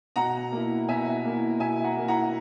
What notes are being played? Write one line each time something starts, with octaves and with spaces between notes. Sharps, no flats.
B2 F#5 A#5
A#3 E4
B2 E5 G#5
A#3 E4
B2 E5 G#5
F#5 A#5
A#3 E4
F#5 A#5